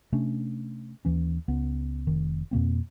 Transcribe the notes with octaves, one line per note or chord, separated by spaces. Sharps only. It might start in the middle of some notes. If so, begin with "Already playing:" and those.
C3 A3 C#4 D4
D#2 E3 C#4
C#2 B3
F1 D#3
F2 B2 A#3 C4